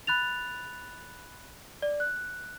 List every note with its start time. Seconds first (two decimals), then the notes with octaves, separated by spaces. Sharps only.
0.07 B5 F#6 A6 F7
1.82 D5
2.00 F#6